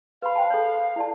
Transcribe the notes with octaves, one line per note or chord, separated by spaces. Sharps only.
B4 F5 B5
C5 G5 A5
A4 C#5
E4 D5 A5